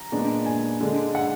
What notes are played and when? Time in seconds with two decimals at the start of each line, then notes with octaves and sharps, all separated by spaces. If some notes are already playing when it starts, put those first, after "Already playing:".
Already playing: A#5
0.12 A#2 G#3 B3 D4
0.46 G#5
0.80 D3 G#3 D4
1.15 F#5